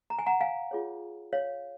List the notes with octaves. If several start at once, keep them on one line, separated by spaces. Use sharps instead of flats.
A#5
G#5
F#5 A#5
F5 G#5
F4 G#4 C#5
C#5 F5